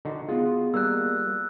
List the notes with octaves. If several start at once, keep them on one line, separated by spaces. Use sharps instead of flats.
D3 D#4 F#4
B3 F4 F#4 G#4
G3 A#3 E6 F#6